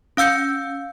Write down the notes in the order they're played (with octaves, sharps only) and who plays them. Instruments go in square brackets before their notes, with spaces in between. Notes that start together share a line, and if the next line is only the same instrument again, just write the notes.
[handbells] C#4 F5 E6 G6 C#7